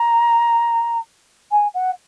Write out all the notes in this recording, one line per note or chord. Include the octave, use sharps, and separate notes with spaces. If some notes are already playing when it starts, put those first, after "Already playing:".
Already playing: A#5
G#5
F#5